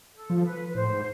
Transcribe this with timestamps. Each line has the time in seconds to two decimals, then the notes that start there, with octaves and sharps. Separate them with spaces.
0.15 A4
0.30 F3
0.45 B4
0.68 B4
0.75 A2 C5
0.88 G#2